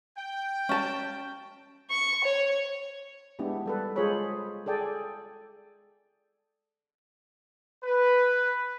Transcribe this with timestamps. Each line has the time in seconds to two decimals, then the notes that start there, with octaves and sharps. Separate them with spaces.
0.18 G5
0.69 C#4 A5
1.91 C#6
2.24 C#5
3.39 G#3 B3 D4 E4 G4
3.66 G3 A4 B4
3.96 G#3 F4 G#4 C5 C#5 B5
4.66 G#4 A4 D5 G5 G#5
7.84 B4